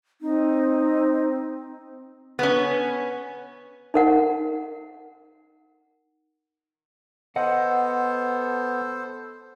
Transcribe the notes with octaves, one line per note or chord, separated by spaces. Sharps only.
C4 D#4
B3 C#4
D#4 A#4 F#5
B3 A4 C5 D#5 F#5